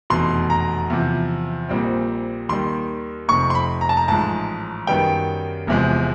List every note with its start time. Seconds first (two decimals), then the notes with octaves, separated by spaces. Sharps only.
0.10 F1 E2 B2 C6
0.50 A#5
0.90 E2 C3 F3
1.69 A#1 A#2 G3 C4
2.49 D#2 D#3 G3 C6
3.29 F1 F2 C3 C#6
3.50 C6
3.55 B5
3.81 A#5
3.89 A5
3.97 A#5
4.08 A1 G#2 F3 G#3 A5
4.87 F#2 D#3 G3 B3 G5
5.67 E1 E2 C3 F3 G#3